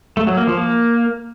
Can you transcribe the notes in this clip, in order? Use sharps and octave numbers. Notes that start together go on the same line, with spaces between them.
A3
F#3
A#3
F3
A#3